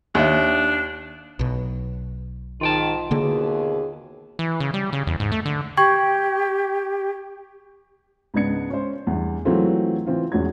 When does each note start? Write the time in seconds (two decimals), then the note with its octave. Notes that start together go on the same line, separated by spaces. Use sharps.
0.15 D#2 D4 E5
1.39 B1 B2
2.61 G#2 D#3 F4 G5 A5
3.11 D#2 B2 D3 A#3 G#4
4.39 E3
4.60 C#3
4.74 G3
4.93 C#3
5.07 E2
5.20 G#2
5.32 A3
5.46 D3
5.77 G4 G5 C#6 G#6
8.34 C#2 G#2 B3 D4 G#6 C#7
8.70 C#4 C5
9.07 E2 G2
9.45 E3 F#3 G#3 A3 C4 F4
10.06 E3 C4 F4
10.32 E1 E2 C#4 F#4 G#6